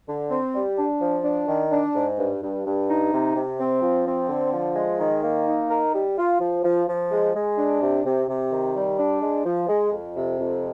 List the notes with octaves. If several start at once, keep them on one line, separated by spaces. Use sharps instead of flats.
D3
C4
G3
D4
F3
D4
D#3
D4
G#2
G2
G2
G2
D#4
C3
C3
C4
F3
C4
D3
F3
G#3
D#3
A#3
D#4
A#4
G3
F4
F3
F3
F3
G#3
G#3
D4
C3
C3
C3
D#3
G3
D4
G#3
F3
G#3
F2
C3
F2